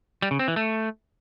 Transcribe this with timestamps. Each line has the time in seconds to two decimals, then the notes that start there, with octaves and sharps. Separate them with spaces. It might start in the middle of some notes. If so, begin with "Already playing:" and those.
0.22 G3
0.31 C#3
0.39 C4
0.48 E3
0.56 A3